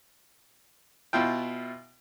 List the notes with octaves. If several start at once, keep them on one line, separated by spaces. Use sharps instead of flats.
B2 E4 F4 G5